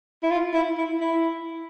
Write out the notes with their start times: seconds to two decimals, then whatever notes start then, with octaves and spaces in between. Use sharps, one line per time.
0.23 E4
0.31 F4
0.54 E4
0.77 E4
1.00 E4